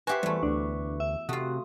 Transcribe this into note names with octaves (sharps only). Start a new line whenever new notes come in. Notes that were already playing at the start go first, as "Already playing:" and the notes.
F#4 G4 B4 C5 E5 G#5 C#6
E2 G3 A3
D2 D4
E5
C3 A3 F4 F#4 D#6